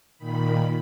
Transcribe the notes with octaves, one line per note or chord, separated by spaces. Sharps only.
A#2 D#3 B5